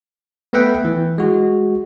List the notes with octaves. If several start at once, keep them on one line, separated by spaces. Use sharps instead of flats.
A3 B3 B4 E5 F#5 G5
E3
G#3 F#4